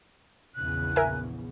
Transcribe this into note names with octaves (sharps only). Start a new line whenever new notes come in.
A#1 E2 C#3 F#6
A#4 E5 G#5